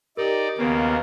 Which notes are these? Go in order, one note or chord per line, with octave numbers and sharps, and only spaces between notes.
D#4 G4 A#4 D5
D#2 C#3 A#3 B3